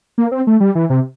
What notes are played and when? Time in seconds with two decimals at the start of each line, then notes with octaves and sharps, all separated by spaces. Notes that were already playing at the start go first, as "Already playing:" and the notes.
0.18 A#3
0.32 C4
0.47 A3
0.60 G3
0.75 E3
0.90 C3